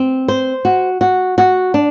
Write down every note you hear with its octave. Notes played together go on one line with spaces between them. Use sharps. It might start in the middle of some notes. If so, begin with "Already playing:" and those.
Already playing: C4
C5
F#4
F#4
F#4
D4